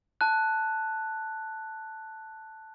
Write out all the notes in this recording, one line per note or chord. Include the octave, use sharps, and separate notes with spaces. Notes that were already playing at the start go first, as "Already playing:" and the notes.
A5 F#6